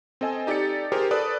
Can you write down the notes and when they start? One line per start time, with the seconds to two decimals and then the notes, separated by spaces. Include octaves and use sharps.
0.21 C4 A4 D#5 G#5
0.47 D#4 G4 A4 D5 A6 C#7
0.92 G4 G#4 A#4 C5
1.11 A4 B4 D5 D#6